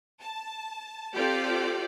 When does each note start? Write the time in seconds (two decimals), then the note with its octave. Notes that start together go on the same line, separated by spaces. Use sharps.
0.21 A5
1.14 C4 F4 G4 A4 D5